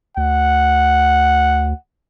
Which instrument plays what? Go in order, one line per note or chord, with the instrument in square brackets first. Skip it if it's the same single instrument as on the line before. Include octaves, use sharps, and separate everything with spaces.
[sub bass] D2 [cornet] F#5